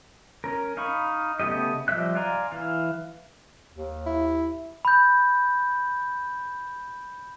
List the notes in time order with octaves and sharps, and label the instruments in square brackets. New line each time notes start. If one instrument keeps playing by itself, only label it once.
[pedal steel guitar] C#4 A#4
D#4 F5 B5 C#6
C#3 A3 B3 G4 D#5
F3 G3 D#5 E5 F#6
D5 F5 G#5 A#5 C6
E3 F5
[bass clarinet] D#2
[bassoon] E4
[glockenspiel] B5 G6